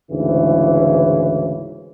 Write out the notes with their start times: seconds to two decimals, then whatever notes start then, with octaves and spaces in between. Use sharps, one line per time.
0.11 D2 G#2 C#3 E3